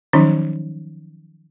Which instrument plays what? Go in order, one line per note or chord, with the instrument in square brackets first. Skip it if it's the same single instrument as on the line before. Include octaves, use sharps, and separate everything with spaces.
[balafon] D#3 F3 F#3 C#4 D#4